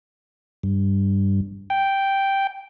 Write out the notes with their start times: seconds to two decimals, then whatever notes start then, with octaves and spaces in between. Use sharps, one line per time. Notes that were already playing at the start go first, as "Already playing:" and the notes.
0.63 G2
1.70 G5